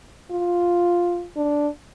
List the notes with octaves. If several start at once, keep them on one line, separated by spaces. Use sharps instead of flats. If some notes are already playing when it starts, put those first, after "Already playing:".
F4
D4